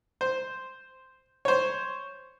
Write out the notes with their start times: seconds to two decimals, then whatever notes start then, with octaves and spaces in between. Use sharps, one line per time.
0.21 C5
1.45 C5 C#5